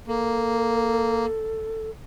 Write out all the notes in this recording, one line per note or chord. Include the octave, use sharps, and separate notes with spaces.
A#3 A4